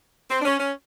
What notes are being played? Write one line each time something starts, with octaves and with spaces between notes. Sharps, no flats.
C4
D4
C#4
C#4